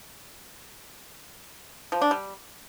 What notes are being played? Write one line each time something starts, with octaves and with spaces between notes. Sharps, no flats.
F3
D4
G3